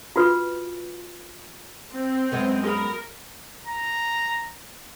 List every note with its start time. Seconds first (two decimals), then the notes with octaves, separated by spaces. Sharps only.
0.16 F4 F#4 B4
1.92 C4
2.32 F#2 G#3 B3
2.63 F#4 G#4 A#4 B5
3.67 A#5